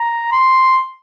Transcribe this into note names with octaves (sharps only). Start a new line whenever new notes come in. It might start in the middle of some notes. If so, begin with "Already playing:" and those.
Already playing: A#5
C6